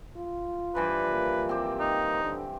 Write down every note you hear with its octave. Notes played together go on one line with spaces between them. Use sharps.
F4
G2 E3 F3 B4
A#3
C4 G4
D#4
D3